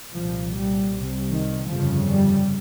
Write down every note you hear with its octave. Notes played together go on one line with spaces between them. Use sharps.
C2 A#2 F3
G3
C2 C3
D#3
G1 F2 C#3 F3
G3